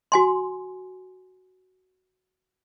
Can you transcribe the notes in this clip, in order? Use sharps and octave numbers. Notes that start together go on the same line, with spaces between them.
F#4 G#5 C6